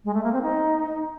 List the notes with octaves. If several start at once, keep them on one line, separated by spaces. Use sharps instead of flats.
G#3
A3
A#3
C4
D#4